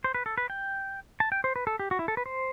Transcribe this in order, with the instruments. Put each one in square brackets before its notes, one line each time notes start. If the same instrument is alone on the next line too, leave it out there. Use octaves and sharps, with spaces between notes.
[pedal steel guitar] C5
B4
A4
B4
G5
A5
G5
C5
B4
A4
G4
F#4
E4
A4
B4
C5